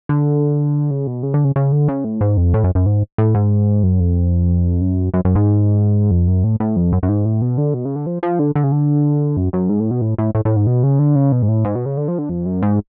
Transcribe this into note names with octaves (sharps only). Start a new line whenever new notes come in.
D3
C#3
B2
C#3
D3
C#3
C#3
D3
C#3
A2
G#2
F2
A2
F#2
F#2
G#2
A2
G#2
F#2
F2
F#2
F#2
F#2
G#2
F2
F#2
A2
A2
F2
F#2
F#2
G#2
A2
B2
D3
B2
C#3
D3
F3
F3
D3
D3
C#3
D3
F#2
F#2
G#2
A2
B2
A2
A2
A2
A2
G#2
B2
C#3
D3
C#3
B2
G#2
A2
G#2
B2
C#3
D3
F3
D3
F2
F#2
G#2